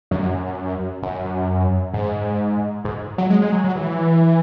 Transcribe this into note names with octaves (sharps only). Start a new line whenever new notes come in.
F#2
F#2
G#2
G#2
F#3
G#3
G#3
F#3
F#3
E3